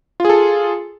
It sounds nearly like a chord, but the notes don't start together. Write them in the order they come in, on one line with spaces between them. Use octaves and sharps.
F4 G#4 A4